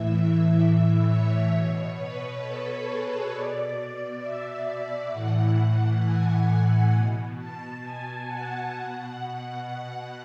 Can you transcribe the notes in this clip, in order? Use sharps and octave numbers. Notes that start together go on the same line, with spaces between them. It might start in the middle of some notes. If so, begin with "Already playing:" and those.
Already playing: A2 E3 E5
C#5
B2
B4
A4
G#4
B2 D5
D5
E5
A2 E3 F#5
G#5
B2
A5
G#5
F#5
B2
F#5